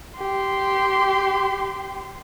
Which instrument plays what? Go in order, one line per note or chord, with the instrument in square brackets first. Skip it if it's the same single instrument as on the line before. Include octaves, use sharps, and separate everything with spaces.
[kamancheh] G4 C6